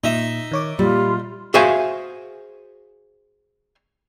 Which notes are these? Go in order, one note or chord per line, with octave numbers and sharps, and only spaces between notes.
A#2 D#4 E5
D#3 C#5 D6
A#2 G3 F4
F#4 G#4 C5 E5 F5 G#5